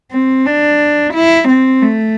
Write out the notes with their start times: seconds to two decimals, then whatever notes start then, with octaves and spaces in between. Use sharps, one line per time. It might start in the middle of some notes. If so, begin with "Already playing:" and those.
0.12 C4
0.46 D4
1.14 E4
1.49 C4
1.82 A3